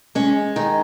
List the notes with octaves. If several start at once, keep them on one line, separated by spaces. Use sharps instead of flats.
G#3 C#4
D#3 D#4